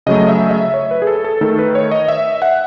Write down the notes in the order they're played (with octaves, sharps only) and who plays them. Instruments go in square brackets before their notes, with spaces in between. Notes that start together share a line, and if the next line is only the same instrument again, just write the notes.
[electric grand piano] C#3 F#3 A3 D#5
E5
E5
C#5
B4
G#4
A4
A4
D#3 A3 A4
B4
C#5
D#5
E5
F#5